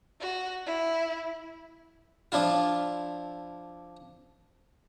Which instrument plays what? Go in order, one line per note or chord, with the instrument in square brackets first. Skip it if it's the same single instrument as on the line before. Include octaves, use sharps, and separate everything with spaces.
[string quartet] F#4
E4
[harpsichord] F3 D4 E4 F4